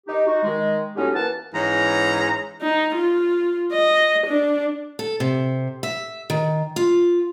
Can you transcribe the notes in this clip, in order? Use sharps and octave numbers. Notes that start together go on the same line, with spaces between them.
D#4 G4
D#4 F#4
D#3 G#3
A2 F#3 B3 C#4 D#4 G4
E3 A#3 F#5 A5
G#2 E3 C#4 A#5
D#4
F4
D#5
D4
A4
C3
E5
D#3
F4